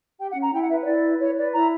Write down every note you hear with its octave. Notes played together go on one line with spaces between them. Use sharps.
G4 G5
F#5
C#4
A#5
E4 G5
F#5
B4 E5
C#5
E4 D5
B4
E4 C#5
B4 D5
E4 A#5